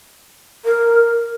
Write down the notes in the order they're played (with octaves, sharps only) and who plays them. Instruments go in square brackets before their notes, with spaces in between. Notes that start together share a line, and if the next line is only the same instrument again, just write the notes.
[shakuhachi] A#4